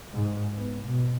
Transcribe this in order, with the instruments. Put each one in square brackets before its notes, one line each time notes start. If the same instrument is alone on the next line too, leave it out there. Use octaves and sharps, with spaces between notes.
[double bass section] G#2
B3
B2